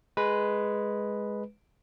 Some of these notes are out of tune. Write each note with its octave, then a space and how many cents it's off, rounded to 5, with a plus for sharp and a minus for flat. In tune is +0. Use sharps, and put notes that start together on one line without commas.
G#3 +0 B4 +0